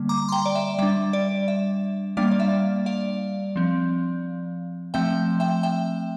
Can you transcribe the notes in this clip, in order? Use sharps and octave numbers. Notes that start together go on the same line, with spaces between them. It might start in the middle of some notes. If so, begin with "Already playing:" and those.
Already playing: D3 G3 A#3
A#5 D6
C6
G5 A#5
D5
E5
G3 D4 E5
D5
E5
G3 A#3 D4 D5 F5
D5
E5
D5 F5
F3 C4
F3 A3 C4 E5 G5
E5 G5
E5 G5